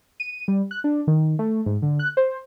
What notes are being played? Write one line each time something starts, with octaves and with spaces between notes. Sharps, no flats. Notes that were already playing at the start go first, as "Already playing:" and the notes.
D#7
G3
F#6
D4
D#3
A3
G#2
D3
F#6
C5